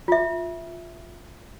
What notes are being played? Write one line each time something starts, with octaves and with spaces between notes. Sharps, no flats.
F4 E5